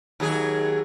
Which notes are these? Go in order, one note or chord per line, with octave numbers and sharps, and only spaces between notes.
D#2 F#3 G#4